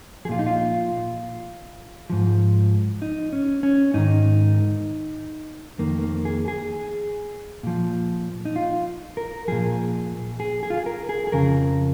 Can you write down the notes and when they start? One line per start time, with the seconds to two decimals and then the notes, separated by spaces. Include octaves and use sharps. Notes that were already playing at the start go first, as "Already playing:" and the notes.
0.25 F3 G#4
0.29 A#2 F4
0.39 D#4
0.46 F4
2.10 G#2 F3
3.02 D#4
3.33 C#4
3.63 C#4
3.94 G#2 D#3 D#4
5.78 F2 D#3 A#3
6.02 A#3
6.25 G#4
6.48 G#4
7.63 A#2 F3
8.45 D#4
8.56 F4
9.17 A#4
9.48 A#2 F3 G#4
10.40 G#4
10.63 G#4
10.70 F4
10.77 G#4
10.86 A#4
11.09 G#4
11.27 G#4
11.32 F2 C#3 F3 A#4